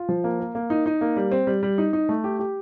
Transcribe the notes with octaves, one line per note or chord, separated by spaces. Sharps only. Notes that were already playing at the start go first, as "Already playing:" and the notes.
Already playing: F4
F3
A#3
A#4
A#3
D#4
D#4
A#3
G3
C4
G3
G3
D#4
D#4
A3
G4
G4